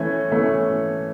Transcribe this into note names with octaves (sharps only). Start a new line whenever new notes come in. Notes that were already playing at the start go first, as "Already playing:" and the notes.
Already playing: E3 A3 C#4 G#6
E3 A3 C#4